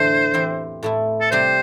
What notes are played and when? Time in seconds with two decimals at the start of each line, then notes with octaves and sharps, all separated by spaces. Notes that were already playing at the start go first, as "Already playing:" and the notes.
Already playing: E2 A2 D3 A3 C5
0.34 E3 C4 E4 G4
0.83 A2 A3 E4
1.21 A4
1.31 C3 G3 C4 G4 C5